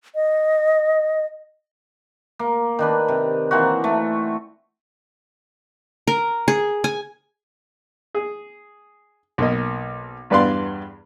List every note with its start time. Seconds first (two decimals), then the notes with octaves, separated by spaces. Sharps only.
0.15 D#5
2.39 A#3
2.79 D#3 D4 B4
3.08 C3
3.51 E3 A#3 C4 F#4
3.84 A3
6.07 A#4
6.48 G#4
6.84 G#5
8.14 G#4
9.38 B1 A#3 D#5
10.30 E2 G2 B4 D5 F5 C6